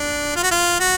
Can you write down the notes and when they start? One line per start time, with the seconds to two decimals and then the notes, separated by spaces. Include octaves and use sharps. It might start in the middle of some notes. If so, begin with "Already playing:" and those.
Already playing: D4
0.36 F4
0.43 F#4
0.51 F4
0.80 F#4